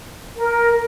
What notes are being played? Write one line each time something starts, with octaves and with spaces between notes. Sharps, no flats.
A#4